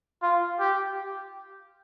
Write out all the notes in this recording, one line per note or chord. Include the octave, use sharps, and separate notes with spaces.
F4
G4